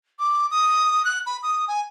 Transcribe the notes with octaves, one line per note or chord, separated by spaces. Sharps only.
D6
D#6
F#6
B5
D#6
G#5